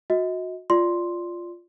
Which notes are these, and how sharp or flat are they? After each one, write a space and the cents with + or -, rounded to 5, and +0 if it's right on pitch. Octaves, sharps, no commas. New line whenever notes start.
F#4 -25 D#5 +35
F4 +0 D5 +0 C6 +0